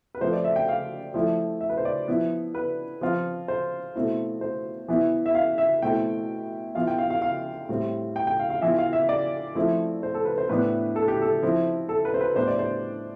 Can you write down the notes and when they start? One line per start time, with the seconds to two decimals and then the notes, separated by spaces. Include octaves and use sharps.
0.15 B4
0.21 F3 A3 C4 F4 C5
0.33 D5
0.45 E5
0.56 G5
0.68 F5
1.14 F3 A3 E4
1.61 E5
1.69 B4
1.77 C5
1.85 D5
2.08 F3 B3 E4
2.55 B4
3.01 F3 C4 F4
3.48 C5
3.96 B2 A3 C4 E4
4.41 C5
4.88 E3 B3 E4
5.26 E5
5.35 F5
5.58 E5
5.82 B2 A3 C4 E4 G5
6.75 E3 B3 F4 F5
6.87 G5
6.98 F5
7.10 F5
7.22 F5
7.69 A2 G3 C4
8.16 G5
8.27 G5
8.39 F5
8.50 F5
8.62 E3 B3 F4 E5
8.78 F5
8.93 E5
9.09 D5
9.55 F3 A3 C4 E4
10.03 C5
10.14 A4
10.25 B4
10.38 C5
10.49 A2 E3 B3 D4 B4
10.96 A4
11.08 G4
11.22 A4
11.42 F3 C4 E4
11.89 A4
12.05 B4
12.14 C5
12.21 B4
12.36 A2 G3 B3 D4 C5
12.47 D5
12.59 C5